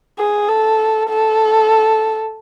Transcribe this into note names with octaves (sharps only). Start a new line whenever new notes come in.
G#4
A4
A4